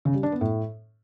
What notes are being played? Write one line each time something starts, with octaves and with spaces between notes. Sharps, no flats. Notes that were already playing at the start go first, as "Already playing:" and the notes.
C#3
G3
D4
B3
A2